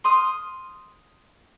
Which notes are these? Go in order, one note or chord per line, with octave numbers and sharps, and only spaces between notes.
C6 D#6 F6